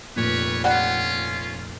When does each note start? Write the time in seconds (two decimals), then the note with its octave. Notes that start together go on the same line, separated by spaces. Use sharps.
0.16 F1 A#2 G3 B4 C#5
0.64 G3 C#4 F4 F#5